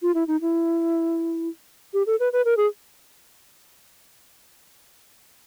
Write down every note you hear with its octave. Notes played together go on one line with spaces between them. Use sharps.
F4
E4
D#4
E4
G4
A4
B4
B4
A#4
G#4